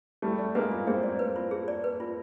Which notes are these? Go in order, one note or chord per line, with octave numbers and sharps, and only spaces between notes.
G3 A3 G#4
D5
G#3 A#3 B4
F4
A#3 C4 G#4
D5
B4
F4
G#4
D5
B4
F4